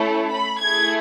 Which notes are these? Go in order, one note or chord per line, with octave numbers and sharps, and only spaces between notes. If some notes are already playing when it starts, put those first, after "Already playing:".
Already playing: A3 C#4 E4 A4
B5
A3 E4 G#4 G#6